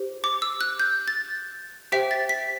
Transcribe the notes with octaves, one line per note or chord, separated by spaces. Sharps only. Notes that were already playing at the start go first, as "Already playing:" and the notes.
Already playing: G4 C5
D6
E6
F#6
G6
A6
G4 C5 E5 G5 B6
A6
B6